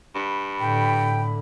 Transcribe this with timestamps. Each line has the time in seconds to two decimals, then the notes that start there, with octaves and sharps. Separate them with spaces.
0.15 G2 B5
0.60 A2 D3 G5